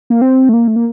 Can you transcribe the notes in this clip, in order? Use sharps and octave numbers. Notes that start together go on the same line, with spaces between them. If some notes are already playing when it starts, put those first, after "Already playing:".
A#3
C4
A3
A#3
A3
A#3